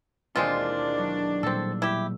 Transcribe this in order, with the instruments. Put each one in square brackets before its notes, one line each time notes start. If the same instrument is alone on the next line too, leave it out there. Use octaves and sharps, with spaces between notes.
[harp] E1 D#2 [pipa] G#3 C4 F4 [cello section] D4
[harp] F#3
[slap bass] A#2 G3 A#3 [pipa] C4 A4 [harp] E6
[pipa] E4 G4